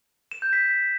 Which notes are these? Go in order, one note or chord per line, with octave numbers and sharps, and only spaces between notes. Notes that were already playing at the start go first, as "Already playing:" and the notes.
E7
G6
B6